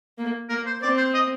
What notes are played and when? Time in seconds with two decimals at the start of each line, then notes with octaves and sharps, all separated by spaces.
0.18 A#3
0.49 A#3 A#4
0.66 C5
0.81 C4 D5
0.97 C5
1.14 D#5